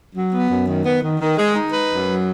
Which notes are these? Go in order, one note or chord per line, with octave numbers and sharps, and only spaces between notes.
F#3
B3
F#2
D#3
B3
D#3
D#3
G#3
D#4
B4
F#2
F#3